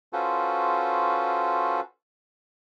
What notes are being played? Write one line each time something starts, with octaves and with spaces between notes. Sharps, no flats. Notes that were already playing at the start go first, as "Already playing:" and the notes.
C#4 F4 F#4 A4 B4 C5